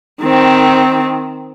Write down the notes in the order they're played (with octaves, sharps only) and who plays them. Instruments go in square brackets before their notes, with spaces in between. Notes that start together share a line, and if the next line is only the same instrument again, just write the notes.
[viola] D#3 C4